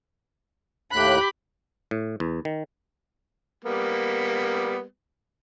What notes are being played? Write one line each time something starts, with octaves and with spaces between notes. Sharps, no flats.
D#2 A2 G4 B5 F#6
A2
E2
D#3
G3 A#3 B3